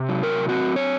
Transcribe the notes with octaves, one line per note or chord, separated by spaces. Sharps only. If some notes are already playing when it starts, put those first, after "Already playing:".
Already playing: C3
F#3
A#4
C4 F#4
C#5